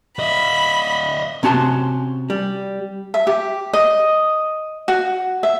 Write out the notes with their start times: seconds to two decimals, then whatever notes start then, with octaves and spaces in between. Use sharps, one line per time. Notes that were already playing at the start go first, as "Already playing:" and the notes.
0.19 D#5 E5 B5
1.43 C3 C#4 F#4 A5 C6
2.30 G3
3.14 E5
3.27 G4
3.73 D#5
4.88 F#4
5.43 E5